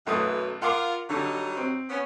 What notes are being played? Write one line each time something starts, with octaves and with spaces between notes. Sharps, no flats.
B1 F#2 E3 A3 D#6
F4 A#4 F#5 C6 D6
D3 F#3 G3 D#4
C4
B3 C#4